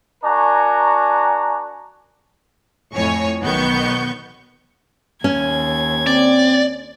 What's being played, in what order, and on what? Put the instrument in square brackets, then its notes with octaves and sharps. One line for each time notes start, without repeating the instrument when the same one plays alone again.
[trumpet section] D4 F#4 A#4 G#5 A#5 C#6
[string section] F2 A2 C#5 G#5 C#6
B1 D#3 B3 C#6 G6
[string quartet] D#2 G#6 [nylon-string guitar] C#4
[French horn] C4 [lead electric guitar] D5